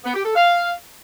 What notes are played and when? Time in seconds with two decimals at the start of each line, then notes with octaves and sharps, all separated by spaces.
0.04 B3
0.14 G4
0.25 A4
0.35 F5